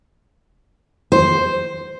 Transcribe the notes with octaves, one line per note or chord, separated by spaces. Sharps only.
C5